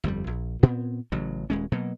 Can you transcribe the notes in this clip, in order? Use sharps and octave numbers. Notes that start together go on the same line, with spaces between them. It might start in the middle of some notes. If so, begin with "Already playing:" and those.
G1 F2 D#3 G3
A#1
A#2 B3 C4
A1 C#3 F#3
D#1 G#3 C#4
B2 F#3 A#3